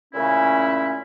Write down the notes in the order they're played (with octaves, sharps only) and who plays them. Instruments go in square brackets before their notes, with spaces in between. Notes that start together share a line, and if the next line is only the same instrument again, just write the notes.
[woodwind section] A#2 C#3 A3 C#4 E4